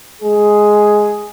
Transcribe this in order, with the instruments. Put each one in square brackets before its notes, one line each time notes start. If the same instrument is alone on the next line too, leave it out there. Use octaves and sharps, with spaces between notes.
[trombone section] G#3 G#4